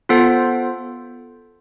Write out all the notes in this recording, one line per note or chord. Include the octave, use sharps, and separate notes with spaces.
B3 F4 A4 C5